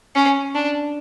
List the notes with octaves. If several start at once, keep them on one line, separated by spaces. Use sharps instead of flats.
C#4
D4